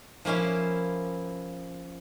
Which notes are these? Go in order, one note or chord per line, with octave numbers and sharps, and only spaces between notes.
F3 A#3 C#4 E4 F5